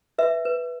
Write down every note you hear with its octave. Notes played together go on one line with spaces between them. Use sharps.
B4 E5
B4